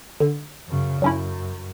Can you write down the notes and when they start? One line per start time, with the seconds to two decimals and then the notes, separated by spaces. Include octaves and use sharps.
0.20 D3
0.68 F#2 C#3
1.02 F#2 F#3 C#4 E4